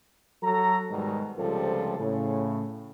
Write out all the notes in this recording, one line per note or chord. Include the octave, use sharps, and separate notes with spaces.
F#3 A4 A#5
G#2 B2 D#3 G3 G#3
C#2 G#2 C3 F3 G3 A4
A2 C#3